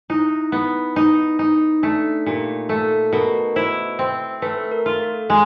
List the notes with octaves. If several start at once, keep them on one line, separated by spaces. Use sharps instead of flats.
D#4 E4
B3
D#4
D#4
A3 D4
A#2 G4
A3 A4
B2 A#4
E4 C5
C4
A3 B4
A#4
F4
A4
G#3 G#4